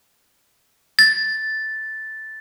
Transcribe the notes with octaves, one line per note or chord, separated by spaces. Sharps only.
A6